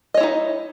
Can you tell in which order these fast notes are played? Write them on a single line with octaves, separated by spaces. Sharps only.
D#5 C#5 E4 D#4